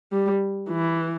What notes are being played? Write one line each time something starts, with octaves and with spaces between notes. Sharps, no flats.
G3
E3